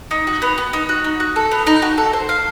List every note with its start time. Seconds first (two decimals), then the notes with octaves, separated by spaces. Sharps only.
0.11 D#4
0.27 F#4
0.42 B3
0.58 B3
0.73 D#4
0.89 F#4
1.04 D#4
1.20 F#4
1.36 A4
1.51 B3
1.67 D#4
1.82 F#4
1.98 A4
2.13 C5
2.29 F5